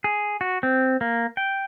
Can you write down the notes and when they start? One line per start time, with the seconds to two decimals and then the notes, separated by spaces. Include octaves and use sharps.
0.04 G#4
0.41 F#4
0.63 C4
1.01 A#3
1.37 G5